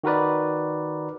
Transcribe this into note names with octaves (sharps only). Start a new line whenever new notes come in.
D#3 F#4 A#4 B4 D5